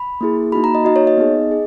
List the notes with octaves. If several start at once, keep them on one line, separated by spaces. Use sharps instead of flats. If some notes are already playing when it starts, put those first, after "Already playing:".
Already playing: B5
A#3 E4 G#4
A#3 D#4 F#4 B5
A#5
D#5
A#3 D#4 F#4 D#5
C#5
D#5
B3 D#4 G#4
G#4